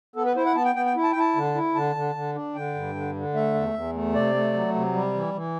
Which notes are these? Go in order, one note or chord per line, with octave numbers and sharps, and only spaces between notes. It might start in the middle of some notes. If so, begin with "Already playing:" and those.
B3 A4
B4
E4 C5
F#5
B3 A5
G5
B3 G5
G5
E4
A5
G5
E4 A5
D3
E4
D3 A5
D3
D3
D4
D3 G5
G2
D3
D3
A3 E5
E2
E2
A3
C3 D5
A3
F#3
C3
G3
E3
E3